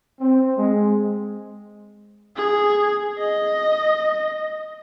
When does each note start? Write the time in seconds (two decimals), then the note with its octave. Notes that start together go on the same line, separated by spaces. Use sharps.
0.20 C4
0.57 G#3
2.36 G#4
3.19 D#5